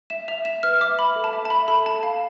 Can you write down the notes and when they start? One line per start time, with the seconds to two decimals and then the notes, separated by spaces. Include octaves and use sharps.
0.10 E5 E7
0.28 E5 F7
0.45 E5 E7
0.63 B4 F6
0.81 E5 D6
0.98 E5 B5
1.16 A4
1.24 A5
1.33 E5
1.45 A5
1.50 E5 B5
1.68 A4 B5
1.86 A4 A5
2.03 F5 A5